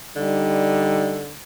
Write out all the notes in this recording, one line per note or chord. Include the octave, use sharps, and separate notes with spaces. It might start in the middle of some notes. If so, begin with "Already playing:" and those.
D3 G3 D#4